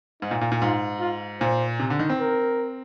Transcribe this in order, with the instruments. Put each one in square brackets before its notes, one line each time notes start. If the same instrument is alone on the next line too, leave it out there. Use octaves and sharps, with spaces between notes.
[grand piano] G#2 [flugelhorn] D#4
[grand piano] A#2
A#2
A#2
[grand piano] G#2 [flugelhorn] F4
[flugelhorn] F4
[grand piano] A#2 [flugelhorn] C5
[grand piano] C3
D3
D#3
C4
[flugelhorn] A#4